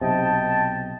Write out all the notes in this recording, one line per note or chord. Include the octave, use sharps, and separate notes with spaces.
B1 C3 D#5 G5 A5